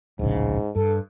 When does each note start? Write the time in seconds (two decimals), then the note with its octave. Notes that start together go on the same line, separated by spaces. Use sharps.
0.19 D1 A#1 G#2 C#3
0.76 G2 A4